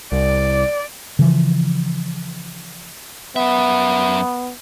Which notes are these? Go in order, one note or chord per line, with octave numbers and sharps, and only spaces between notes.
C2 D5
C#3 E3 F3
F#2 B3 E5